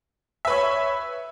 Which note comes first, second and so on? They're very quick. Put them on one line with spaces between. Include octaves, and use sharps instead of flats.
E5 B4 C#5